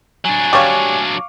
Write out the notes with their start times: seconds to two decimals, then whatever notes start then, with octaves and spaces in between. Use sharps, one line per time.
0.25 F#3 D4 G#5
0.53 G3 C#5 F5 C#6 D6